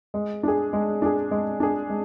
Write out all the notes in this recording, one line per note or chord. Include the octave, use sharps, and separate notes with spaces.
G#3
D4 G#4
G#3
D4 G#4
G#3
D4 G#4
G#3